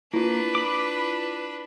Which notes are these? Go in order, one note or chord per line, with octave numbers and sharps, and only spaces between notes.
A#3 D4 E4 F4 B4
B5 D6